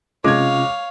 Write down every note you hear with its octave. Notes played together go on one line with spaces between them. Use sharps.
C3 G#3 C#4 F4 C#5 F5 D6 G#6